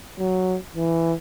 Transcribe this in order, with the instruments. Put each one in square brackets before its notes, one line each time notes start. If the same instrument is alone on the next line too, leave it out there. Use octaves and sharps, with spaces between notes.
[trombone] F#3
E3